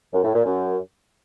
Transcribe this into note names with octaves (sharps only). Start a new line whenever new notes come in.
F#2
A2
A#2
F#2